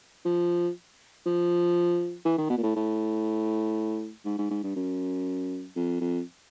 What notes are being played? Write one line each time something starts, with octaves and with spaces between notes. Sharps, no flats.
F3
F3
E3
D#3
B2
A#2
A2
A2
G#2
G#2
G#2
G2
F#2
F2
F2